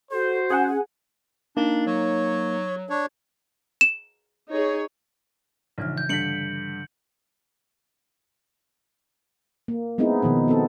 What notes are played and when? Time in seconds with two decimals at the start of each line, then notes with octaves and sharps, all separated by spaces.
0.12 F#4 A4 C5
0.50 C#4 G#4 F#5 G#5
1.57 A#3 D4 D#4
1.86 F#3 C#5
2.90 D4 C#5
3.81 E7
4.50 D#4 G#4 C#5
5.78 A#1 G#2 C#3 E3 F6
5.98 G6
6.09 G2 D3 B6 C#7 D7 F#7
9.68 A#3
9.98 G#3 B3 C4 D#4 E4 G#4
10.22 B2 D#3 F3 D#4
10.48 B3 C4 A4